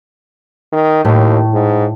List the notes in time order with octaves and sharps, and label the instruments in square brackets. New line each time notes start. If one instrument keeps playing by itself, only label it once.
[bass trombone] D#3
[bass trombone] D#2 [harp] A2 A3
[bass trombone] G#2